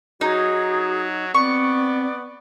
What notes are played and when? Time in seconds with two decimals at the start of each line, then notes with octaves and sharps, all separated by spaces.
0.21 F#3 D#4 F#4 G#4
1.34 B3 C4 D5 C#6